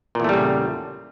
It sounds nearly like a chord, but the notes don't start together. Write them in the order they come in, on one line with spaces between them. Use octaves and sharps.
A#2 E2 A3 G3 C#3